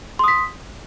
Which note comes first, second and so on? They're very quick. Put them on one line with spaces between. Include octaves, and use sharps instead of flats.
C6 D#6 B6